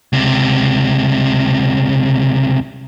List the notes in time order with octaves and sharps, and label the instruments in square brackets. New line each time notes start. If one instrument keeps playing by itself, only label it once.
[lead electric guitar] C#2 C3